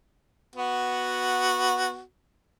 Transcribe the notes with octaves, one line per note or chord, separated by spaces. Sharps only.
B3 F#4